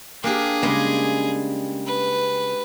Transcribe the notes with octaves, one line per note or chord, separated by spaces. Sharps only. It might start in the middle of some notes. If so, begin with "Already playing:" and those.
A#3 D4 G4 G#4
C#3 G3 G#3 A#3
B4